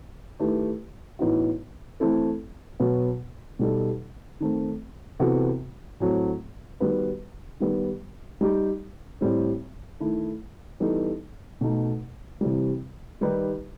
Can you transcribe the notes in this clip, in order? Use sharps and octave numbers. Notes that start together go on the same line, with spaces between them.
D#3 A3 E4 G4 B4
A2 E3 B3 D#4 F#4
E3 A3 C4 E4 A4
B2 F#3 B3
B2 G3 D#4 A4
D#3 A3 C4
C3 E3 B3 F#4 A4
A2 F#3 A3 C4
D#3 G3 B3 F#4 B4
D#3 G3 B3
G3 D#4 G4
A2 G3 C4
D#3 A3 E4
E3 G3 B3 D#4 A4
B2 A3 D#4
C3 E3 G3
D#3 G3 D#4 G4 B4